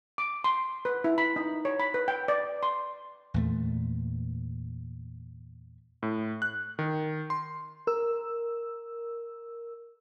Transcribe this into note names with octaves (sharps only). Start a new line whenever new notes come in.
D6
C6
B4
E4
B5
D#4
C#5
B5
B4
G5
D5
C6
E2 A#2 A3
A2
F#6
D#3
C6
A#4 E6